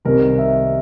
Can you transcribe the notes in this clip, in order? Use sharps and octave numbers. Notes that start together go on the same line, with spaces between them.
C2 C3 D#3 A#4
E5